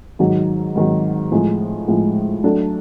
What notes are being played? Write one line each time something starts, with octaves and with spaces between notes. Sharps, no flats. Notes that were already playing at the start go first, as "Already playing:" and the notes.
G#2 D#3 F#3
G#2 D#3 F#3
A2 F3 G#3
A2 F3 G#3
F#3 A3 D4